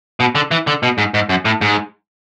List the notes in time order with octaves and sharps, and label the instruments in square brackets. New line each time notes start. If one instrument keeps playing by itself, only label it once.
[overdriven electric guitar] B2
D3
E3
D3
B2
G#2
G#2
F#2
A2
G#2